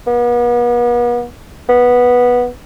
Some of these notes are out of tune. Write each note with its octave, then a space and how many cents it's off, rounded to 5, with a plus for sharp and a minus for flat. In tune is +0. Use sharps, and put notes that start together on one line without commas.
B3 -40
B3 -10